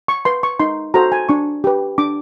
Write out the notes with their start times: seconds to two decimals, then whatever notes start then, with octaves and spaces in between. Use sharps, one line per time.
0.08 C#6
0.25 B4 C6
0.43 C#6
0.60 D#4 C6
0.94 F#4 A4 C5 A#5
1.12 G#5
1.29 D4 C#6
1.64 G4 B4
1.98 D4 D6